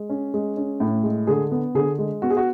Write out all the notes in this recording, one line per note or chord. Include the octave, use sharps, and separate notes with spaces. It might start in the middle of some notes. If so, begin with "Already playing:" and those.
Already playing: G#3
C#4
G#3
C#4
A2
G#3
D3 G#4
B3
D3 G#4
G#3
B3 F#4
G#4
F#4